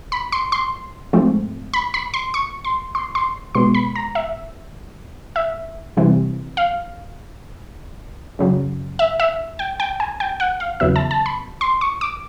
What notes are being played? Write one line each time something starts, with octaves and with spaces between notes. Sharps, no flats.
B5
C6
C6
G#2 F3 A3 C4
B5
B5
C6
C#6
C6
C6
C6
B2 G#3 B3 C6
B5
A#5
E5
E5
C3 E3 G3 C4
F5
F#2 C#3 F#3
E5
E5
G5
G5
G#5
G5
F#5
F5
E2 C#3 F#3 B3 E5
A5
A5
B5
C6
C#6
D6